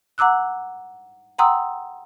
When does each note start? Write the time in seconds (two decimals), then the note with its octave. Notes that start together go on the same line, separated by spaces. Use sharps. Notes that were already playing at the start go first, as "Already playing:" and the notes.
0.18 F#5 A#5 D6 E6 F#6
1.38 F#5 G5 A#5 C6 D#6 E6